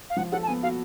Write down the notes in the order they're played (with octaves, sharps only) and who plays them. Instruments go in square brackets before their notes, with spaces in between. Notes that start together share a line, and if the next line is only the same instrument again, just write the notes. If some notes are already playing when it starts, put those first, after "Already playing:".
[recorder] F5
[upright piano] F3 [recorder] F#5
[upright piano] A4 [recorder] F#5
[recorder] A5
[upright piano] B3 [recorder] G#5
[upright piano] F#4 [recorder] F5